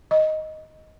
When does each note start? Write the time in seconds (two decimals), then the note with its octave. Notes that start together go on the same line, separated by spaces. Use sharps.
0.11 D#5